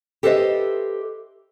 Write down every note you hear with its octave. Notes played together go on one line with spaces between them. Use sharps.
G4 A4 B4 C5 D#5 E5